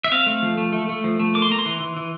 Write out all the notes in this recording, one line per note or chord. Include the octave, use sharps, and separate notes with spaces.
E5
C4 F5
A3
F3
A3
A3
A3
F3
A3
A#3 D6
C6
A#3 A#5
C6
E3
E3
E3